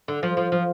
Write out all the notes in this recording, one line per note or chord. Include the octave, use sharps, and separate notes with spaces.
D3
F3
F3
F3